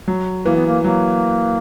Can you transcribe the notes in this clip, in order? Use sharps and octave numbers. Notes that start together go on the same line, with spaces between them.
F#3
E3 A#3
B3
A#3
F#3 A#3